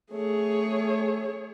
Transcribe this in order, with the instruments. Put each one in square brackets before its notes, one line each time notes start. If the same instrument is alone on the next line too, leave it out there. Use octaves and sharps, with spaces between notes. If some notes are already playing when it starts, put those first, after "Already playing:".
[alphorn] A3 [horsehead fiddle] G#4 C#5